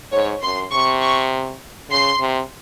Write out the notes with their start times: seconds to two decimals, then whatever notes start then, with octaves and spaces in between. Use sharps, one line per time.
0.11 G#2 C#5
0.42 F#2 C6
0.71 C3 C#6
1.01 C#6
1.90 C#3 C6
2.20 C3